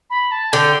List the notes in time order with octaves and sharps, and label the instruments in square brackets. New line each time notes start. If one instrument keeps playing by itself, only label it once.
[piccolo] B5
A5
[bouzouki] D3 [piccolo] G5